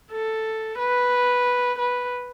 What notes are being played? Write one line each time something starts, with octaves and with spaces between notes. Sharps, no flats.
A4
B4
B4